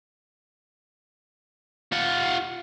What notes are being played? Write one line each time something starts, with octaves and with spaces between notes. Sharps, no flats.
F4 F#5